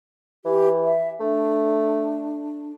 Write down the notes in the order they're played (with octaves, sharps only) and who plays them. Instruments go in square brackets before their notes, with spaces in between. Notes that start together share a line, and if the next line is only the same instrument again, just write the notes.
[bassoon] E3 [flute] G4
[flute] E5
[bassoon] A3 [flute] D4